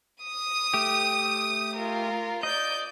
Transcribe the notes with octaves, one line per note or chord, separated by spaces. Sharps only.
D#6 D#7
A3 G4
F4 A#4
D5 D#5 G6